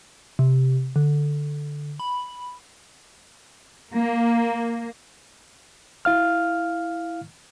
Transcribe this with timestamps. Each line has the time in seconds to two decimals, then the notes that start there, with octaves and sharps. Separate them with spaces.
0.39 C3
0.96 D3
2.00 B5
3.93 A#3
6.05 E4 F5 F6